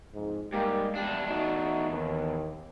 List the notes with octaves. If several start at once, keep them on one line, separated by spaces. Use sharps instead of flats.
F2 G#2
G#2 G3 A#3 G4
E2 G3 D4
A3 D#4 F#4
D#2